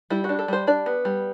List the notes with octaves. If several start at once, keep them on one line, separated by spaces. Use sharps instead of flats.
G3 E4
F#4
D4
A4
G3 C5
D4 D5
B3
G3